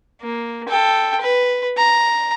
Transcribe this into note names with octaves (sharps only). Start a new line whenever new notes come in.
A#3
A4 G5
B4
A#5